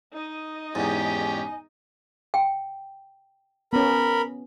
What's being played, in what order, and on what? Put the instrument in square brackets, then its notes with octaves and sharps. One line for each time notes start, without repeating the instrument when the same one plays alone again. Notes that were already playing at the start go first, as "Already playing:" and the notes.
[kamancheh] D#4 D#5
[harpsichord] E2 G#2 [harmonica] C#4 G4 [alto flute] G#5
[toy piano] G5
[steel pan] B3 C#4 [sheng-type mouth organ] A#4 B5